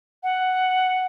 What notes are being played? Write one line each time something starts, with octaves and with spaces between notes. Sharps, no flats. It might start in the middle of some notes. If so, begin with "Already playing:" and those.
F#5